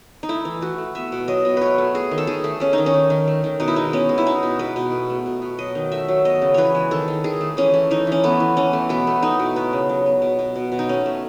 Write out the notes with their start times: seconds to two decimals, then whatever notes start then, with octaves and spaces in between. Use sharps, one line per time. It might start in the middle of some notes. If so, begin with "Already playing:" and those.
0.23 D#4
0.29 A3 E4
0.45 E3
0.61 A3 F#4
0.78 A3
0.95 B3 E5
1.12 B2
1.28 F#3 D#5
1.45 B2
1.57 A3 B4 C#5
1.78 A3
1.95 A3 G#4
2.11 D#3
2.18 A4
2.27 D#3 G#4
2.44 A3
2.60 A3 C#4
2.73 D#3 D#4
2.86 C#4
2.94 D#3
3.10 D#3
3.28 A3
3.44 D#3
3.60 B2 D#4
3.68 E4
3.76 G#3 D#4
3.93 B3 C#4
4.09 G#3
4.18 E4
4.26 G#3 D#4
4.43 B2
4.59 G#3 B4
4.76 B2
4.92 A3
5.10 A3
5.26 B2
5.42 B2
5.59 F#3 D#5
5.75 D#3
5.92 A3 E5
6.08 F#3
6.25 B3 D#5
6.42 C#3
6.54 E3 B4 C#5
6.75 G#3
6.91 D#3 A4
7.08 D#3
7.24 D#3 G#4
7.41 A3
7.57 E3 C#4
7.74 A3
7.91 E3 D#4
8.07 E3 C#4
8.24 A3 B3
8.40 E3
8.57 E3 C#4
8.73 A3
8.89 B2 B3
9.07 A3
9.22 A3 D#4
9.40 B2
9.56 B3
9.73 C#3
9.90 F#3
10.06 B3
10.22 B2
10.39 B2
10.56 B2
10.72 B2
10.79 D#4
10.89 A3 C#4
11.06 A3